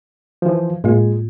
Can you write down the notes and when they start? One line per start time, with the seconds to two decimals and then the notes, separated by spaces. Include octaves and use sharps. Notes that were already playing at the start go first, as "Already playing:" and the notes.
0.42 E3 F3
0.84 A2 G#3 A#3 F4